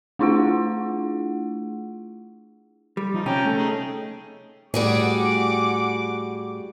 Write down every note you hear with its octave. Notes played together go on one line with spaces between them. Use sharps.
A3 D4 E4 F4 G#4 F#5
G3
F3 D#4
C3 C#4 G5 A5 A#5
A3
D#4 G#4
A2 G3 F#4 G#4 F#5 D6